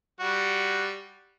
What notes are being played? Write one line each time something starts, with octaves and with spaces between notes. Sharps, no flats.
G3 F#4